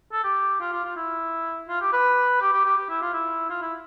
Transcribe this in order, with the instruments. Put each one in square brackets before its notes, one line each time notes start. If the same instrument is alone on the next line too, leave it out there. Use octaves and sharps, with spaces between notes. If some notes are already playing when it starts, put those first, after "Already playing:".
[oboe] A4
G4
F4
F4
F4
E4
F4
G4
B4
G4
G4
G4
G4
E4
F4
E4
F4
E4